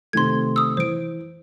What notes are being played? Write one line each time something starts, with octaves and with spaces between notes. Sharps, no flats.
C3 D#3 A3 C6 G#6
D#6 E6
E3 C5 D7